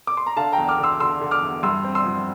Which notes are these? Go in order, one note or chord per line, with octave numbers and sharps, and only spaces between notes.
D6
C6
A#5
D3 F5 A5
G5 A#5
E2
D6 F6
D3
C6 E6
D3 C6 E6
D3
D6 F6
E2
G2 C6 E6
C4
C6 E6
F3